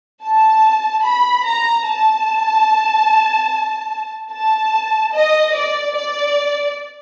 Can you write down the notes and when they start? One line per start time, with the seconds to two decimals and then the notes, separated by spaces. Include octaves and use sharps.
0.22 A5
1.03 B5
1.44 A#5
1.85 A5
4.31 A5
5.12 D#5
5.54 D5
5.94 D5